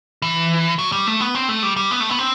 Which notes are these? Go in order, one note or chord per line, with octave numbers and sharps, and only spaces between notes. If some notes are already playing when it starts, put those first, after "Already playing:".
E3
F#3
G3
A3
B3
C4
A3
G3
G3
B3
A3
B3
C4